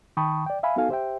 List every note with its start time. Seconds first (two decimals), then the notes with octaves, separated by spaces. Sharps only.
0.17 D#3 G5 A5 B5 C#6 D#6
0.46 D5 G5
0.63 E5 F5 G#5 B5
0.76 B3 D#4 F#4 A4 F5 G#5
0.89 G4 C5 E5 G5